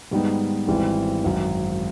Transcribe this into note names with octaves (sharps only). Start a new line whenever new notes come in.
G#2 D#3 G3 B3 D#4
G#1 G#2 E3 G3 C4
G#1 F#2 D#3 F#3